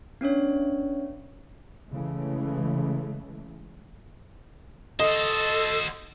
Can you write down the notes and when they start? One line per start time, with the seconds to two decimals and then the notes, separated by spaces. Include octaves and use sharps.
0.21 B3 C#4 D4 C#5
1.92 C#3 E3 G#3 A3
5.00 F#4 A4 C5 D#5